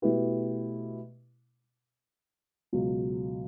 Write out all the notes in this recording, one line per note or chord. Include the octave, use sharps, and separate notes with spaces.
B2 A3 E4 G4 B4
C#2 B2 F#3